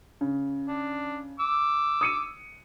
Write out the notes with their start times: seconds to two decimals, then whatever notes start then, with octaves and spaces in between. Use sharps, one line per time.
0.21 C#3
0.67 D4
1.40 D6 E6
2.01 D#6 C#7 D#7